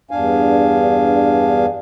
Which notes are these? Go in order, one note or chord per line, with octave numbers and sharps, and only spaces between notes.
E2 G2 D4 F5 G#5